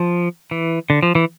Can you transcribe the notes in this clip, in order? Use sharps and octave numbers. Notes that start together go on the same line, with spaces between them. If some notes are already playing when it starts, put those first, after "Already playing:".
Already playing: F3
E3
D3
F3
E3